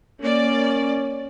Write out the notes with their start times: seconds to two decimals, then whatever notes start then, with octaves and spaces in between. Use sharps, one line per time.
0.21 A#3 C#4 D5